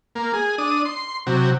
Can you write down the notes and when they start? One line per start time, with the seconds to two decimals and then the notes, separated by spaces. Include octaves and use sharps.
0.15 A#3
0.33 G#4
0.58 D4 D#6
0.85 C6
1.27 C3 F#3